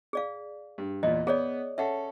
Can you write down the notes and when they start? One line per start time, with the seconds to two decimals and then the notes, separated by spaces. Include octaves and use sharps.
0.13 G#4 D5 F5
0.78 G2
1.03 E2 A#2 D#5
1.27 B3 G#4 C#5 D5
1.78 C#4 A4 E5 F#5